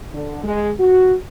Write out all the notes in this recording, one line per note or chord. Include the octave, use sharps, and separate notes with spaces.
D3
G#3
F#4